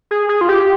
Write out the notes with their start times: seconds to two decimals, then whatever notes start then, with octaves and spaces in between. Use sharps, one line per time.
0.11 G#4
0.29 G#4
0.41 F4
0.49 G4